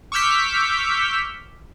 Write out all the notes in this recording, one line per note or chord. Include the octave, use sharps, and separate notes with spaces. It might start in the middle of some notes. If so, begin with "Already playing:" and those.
C#6 D6 E6 F6 G6 B6